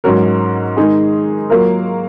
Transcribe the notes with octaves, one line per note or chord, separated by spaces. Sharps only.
G#2 F#3 C#4 F#4 A#4
D#3 G#3 D#4 G#4
F#3 A#3 F4 A#4